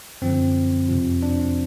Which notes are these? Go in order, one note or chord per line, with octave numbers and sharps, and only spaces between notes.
F#2 D3 F3 C4
F2 C3 F3
D4